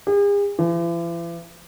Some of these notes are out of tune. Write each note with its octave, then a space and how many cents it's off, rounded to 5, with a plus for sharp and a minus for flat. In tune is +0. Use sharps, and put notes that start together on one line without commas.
G#4 -45
E3 +45